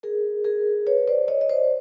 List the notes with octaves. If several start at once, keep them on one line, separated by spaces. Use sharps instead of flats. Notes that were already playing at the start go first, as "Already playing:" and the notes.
G#4 A#4
G#4 A#4
B4 C#5
C5 D5
C#5 D#5
D#5
C5 D5